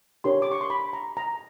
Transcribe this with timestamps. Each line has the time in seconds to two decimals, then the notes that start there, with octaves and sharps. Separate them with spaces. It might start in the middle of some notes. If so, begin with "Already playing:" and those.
0.24 D4 G4 A#4 C#5 C6
0.42 D6
0.52 C#6
0.61 C6
0.70 B5
0.93 A#5
1.17 A#5